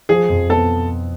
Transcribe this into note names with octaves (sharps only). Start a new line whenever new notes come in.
F3 G#4
F2
B3 A4